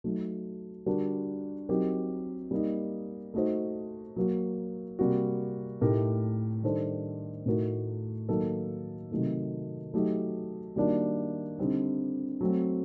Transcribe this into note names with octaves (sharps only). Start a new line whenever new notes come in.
F#3 A3 D#4
D3 G3 D4 F#4 A#4
F#3 C4 D#4 G4 A#4
G3 A#3 D#4
A3 D#4 F#4 C5
F#3 A#3 F#4
C3 G3 A#3 F#4
A2 A3 D#4 G4 A#4
D#3 G3 D4 A4 C5
A2 A3 D#4 F#4 A#4
D#3 F#3 A#3 D#4 A4
C3 D#3 F#3 A3 D#4
F#3 A3 D#4 G4
D#3 G3 A#3 D4 F#4
D3 G3 C4 D#4
F#3 A3 C4